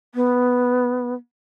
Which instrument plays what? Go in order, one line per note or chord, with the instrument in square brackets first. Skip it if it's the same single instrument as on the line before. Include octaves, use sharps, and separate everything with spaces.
[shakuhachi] B3